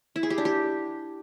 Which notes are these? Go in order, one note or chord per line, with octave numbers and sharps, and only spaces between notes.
E4
G#4
G4
D4
G4